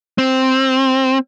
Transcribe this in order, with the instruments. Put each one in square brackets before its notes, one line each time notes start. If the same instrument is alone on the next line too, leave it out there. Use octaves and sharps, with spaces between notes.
[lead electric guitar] C4